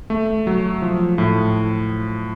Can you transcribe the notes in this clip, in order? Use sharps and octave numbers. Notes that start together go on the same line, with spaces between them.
A3
F#3
F3
A2